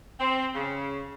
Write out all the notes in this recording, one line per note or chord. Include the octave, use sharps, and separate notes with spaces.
C4
C#3